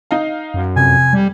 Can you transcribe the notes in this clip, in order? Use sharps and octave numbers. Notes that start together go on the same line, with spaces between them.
D#4 D#5 F5
F#2
F2 C3 G#5
G3